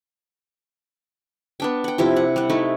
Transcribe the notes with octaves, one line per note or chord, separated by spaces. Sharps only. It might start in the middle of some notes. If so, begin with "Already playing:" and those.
B3 D4 G5
F#5 G5
C3 F3 E4 G4
F#5
G3 F#5
A3 D#4 E4